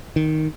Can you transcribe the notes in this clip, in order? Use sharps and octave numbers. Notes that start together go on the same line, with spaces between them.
D#3